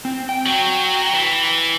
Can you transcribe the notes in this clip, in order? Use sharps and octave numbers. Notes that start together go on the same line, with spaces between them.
C4
G5
F#3
E3